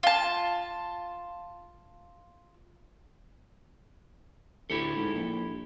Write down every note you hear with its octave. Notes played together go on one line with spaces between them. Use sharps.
F4 A5
D2 E4 G4 A4
G#2
A#1